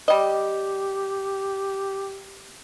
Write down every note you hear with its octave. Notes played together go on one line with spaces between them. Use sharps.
G3 G4 D#5